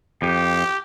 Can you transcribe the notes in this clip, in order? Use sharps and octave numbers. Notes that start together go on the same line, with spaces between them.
F2 G4